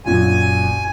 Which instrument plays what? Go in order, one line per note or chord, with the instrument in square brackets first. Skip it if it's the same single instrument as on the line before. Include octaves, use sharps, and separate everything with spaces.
[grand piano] F#2 A#2 [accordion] G#5